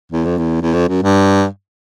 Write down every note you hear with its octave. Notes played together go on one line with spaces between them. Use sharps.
E2
F2
E2
E2
F2
F#2
G2